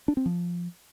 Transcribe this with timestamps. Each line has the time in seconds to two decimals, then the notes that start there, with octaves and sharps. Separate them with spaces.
0.08 D4
0.17 C4
0.26 F3